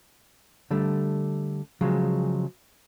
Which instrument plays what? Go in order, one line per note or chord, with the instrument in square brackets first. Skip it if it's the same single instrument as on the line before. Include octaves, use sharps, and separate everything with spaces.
[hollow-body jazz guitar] D3 G3 A3
C#3 F3 F#3 G#3